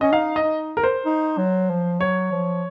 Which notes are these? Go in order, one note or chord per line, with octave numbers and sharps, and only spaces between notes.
C#4 D#5
D#4 F5
D#5
D#4
A#4
C5
D#4
F#3
F3
F#3 C#5
F3